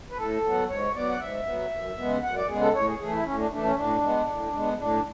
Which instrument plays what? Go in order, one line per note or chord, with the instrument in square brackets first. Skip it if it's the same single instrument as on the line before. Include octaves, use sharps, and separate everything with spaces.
[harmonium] B4
A2 A4
F#3 B3
G#2 C#5
F#3 B3 D5
F#5
G#2 E5
F#3 B3
F#2
C#3 G#3 B3
F#2 F#5
D5
C#3 G#3 B3 G#4
A4
A2 C#5
G#4
E3 A3 G#4
E4
A2 C#4
D4
E3 A3 D4
C#4
A2 D4
G#3 B3
A2
G#3 B3
A2 D4